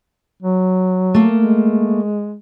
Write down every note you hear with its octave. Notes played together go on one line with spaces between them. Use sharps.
F#3
A3 A#3
G#3